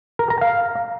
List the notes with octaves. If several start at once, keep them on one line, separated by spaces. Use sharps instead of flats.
A#4
A#5
F5